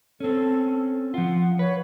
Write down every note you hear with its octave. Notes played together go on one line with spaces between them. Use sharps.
C4 C#4 A4
F3 F4 F#5
B4 C#5